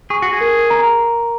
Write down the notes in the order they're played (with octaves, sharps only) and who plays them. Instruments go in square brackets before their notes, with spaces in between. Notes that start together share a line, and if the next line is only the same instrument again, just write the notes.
[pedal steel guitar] G#4 [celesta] C#6
[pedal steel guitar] F#4
G#4
[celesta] A#4
A#5